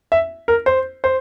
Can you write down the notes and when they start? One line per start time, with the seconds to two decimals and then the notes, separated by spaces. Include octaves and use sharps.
0.12 E5
0.48 A#4
0.66 C5
1.04 C5